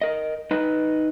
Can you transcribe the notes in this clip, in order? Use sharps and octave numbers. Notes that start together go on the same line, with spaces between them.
A#4 D#5
D#4 B4 D#5